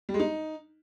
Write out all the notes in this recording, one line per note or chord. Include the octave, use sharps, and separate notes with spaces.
G3
G#3
D#4